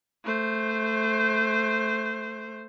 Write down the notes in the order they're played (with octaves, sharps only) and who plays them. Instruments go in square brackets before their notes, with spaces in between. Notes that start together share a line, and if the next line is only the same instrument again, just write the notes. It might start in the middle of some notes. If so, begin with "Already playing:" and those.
[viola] A3 C5